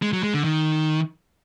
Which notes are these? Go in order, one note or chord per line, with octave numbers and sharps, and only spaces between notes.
G#3
F#3
G#3
D3
D#3